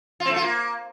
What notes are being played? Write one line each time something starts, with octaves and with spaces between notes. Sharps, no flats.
F4
C4
A3
F4
A#3